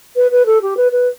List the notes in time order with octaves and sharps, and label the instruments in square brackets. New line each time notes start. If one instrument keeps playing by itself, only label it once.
[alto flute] B4
B4
A4
G4
B4
B4